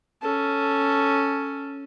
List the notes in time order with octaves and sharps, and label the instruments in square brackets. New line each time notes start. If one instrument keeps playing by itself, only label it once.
[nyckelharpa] C#4 A4